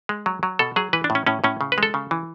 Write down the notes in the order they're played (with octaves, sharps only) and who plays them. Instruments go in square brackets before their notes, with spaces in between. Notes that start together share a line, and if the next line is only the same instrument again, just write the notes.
[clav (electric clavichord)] G#3
F#3
F#3
B2 A4
F#3 G#4
E3 B4
D4
A2
C#4
A2 C#4
A2 C#4
C#3
B4
G#3 A4
C#3
E3